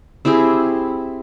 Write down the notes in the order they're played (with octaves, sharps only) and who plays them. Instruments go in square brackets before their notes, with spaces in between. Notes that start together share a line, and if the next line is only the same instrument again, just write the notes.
[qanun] C4 E4 G4 G#4